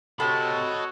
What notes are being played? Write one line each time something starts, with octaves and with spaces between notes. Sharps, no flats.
C3 F#4 A4 C#5 D#5 B5